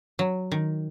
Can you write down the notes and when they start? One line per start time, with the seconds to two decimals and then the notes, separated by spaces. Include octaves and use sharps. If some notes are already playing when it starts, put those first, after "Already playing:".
0.19 F#3
0.51 D#3